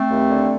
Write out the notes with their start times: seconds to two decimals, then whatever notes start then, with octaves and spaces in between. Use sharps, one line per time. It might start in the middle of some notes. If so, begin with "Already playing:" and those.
Already playing: A3 C4
0.10 D#2
0.30 D3